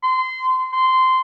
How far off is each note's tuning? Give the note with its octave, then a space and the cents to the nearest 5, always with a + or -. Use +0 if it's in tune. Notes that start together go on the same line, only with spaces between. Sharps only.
C6 -25
C6 -15